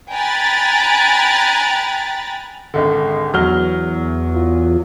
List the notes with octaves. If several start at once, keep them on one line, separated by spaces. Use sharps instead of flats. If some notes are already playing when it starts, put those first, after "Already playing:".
G5 G#5 A#5 B5 F#6 A6
G#1 C#2 D3
E2 F#3 F6 G7
F4